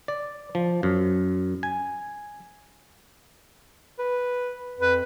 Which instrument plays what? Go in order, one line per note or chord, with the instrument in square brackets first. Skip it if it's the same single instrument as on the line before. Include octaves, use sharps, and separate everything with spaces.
[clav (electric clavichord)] D5
F3
F#2
G#5
[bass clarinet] B4
[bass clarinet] F2 [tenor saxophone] B4